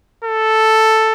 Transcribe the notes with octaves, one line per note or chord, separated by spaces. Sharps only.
A4